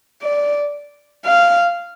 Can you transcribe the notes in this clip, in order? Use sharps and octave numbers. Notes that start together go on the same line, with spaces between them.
D5
F5